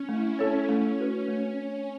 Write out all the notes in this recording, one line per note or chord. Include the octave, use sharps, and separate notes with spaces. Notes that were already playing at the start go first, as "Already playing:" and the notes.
Already playing: C#4
A3 E4
C#4 A4 C#5
A3 C#4
F#4 B4
A3